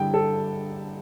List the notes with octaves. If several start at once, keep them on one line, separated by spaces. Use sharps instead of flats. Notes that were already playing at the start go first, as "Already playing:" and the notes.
Already playing: G2 D3 G3 E4 G5
A4